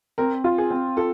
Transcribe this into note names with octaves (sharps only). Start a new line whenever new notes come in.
C4 A#4
F4
G#4
C4
F4 A4